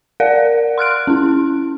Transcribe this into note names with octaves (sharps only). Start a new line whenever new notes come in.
A#4 D5 F5 F#5
C6 F6 F#6 D7
C#4 E4